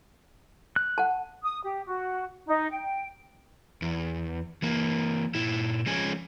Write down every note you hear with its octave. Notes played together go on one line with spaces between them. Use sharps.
F#6
F#5 A5
D#6
G4
F#4
D#4
G5
E2
E3 A#3
A#2 E4
F3 G#3 C#4 G#5